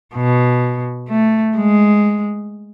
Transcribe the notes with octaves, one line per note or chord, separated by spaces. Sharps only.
B2
A3
G#3